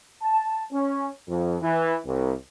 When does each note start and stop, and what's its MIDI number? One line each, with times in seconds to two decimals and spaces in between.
0.21 0.61 81
0.72 1.06 61
1.28 1.56 41
1.61 1.94 52
2.05 2.32 36